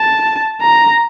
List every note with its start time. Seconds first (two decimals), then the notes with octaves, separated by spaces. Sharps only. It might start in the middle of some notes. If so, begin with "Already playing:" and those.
Already playing: A5
0.62 A#5